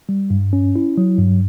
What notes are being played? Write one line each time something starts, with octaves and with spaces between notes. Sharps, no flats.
G3
G2
C#4
E4
F#3
G2